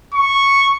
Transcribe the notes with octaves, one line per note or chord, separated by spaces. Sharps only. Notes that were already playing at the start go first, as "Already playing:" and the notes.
C#6